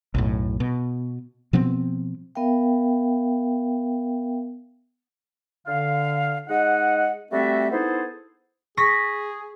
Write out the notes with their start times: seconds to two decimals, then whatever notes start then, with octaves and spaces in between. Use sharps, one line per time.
0.14 B1 F#2 A2
0.60 B2
1.53 B2 F3 B3 C4
2.35 B3 A#4 E5 F5 G5
5.66 D3 F5
6.48 G#3 D#4 D#5 F#5
7.31 G3 A3 C4 F#4 A4 E5
7.71 B3 D#4 E4 G#4 A4 C5
8.77 G#4 C#6 A#6 B6